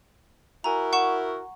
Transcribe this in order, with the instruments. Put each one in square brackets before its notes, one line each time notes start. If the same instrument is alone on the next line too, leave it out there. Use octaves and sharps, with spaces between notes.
[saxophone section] E4 F#4 A#4 [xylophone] G#5 A#5
[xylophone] F#5 C#6 E7